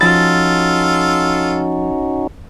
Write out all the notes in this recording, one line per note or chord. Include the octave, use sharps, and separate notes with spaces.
F3 C#4 D#4 F4 F#4 A4 A6